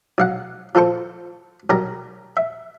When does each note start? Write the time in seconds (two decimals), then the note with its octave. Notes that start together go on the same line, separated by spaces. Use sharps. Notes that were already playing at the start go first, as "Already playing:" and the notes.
0.18 B1 F5 F#5
0.75 F3 F4 A4 C5 C#6
1.70 B1 G3 A#4 A#5
2.37 E5